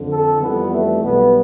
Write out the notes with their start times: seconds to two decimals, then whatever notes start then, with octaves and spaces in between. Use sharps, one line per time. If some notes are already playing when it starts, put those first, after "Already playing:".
Already playing: F2 D3 F3
0.09 A4
0.40 F2 E3 G3 B3
0.72 A3
1.03 B1 B2 G3 B3